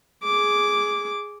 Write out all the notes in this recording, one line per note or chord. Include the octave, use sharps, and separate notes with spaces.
G#4 D6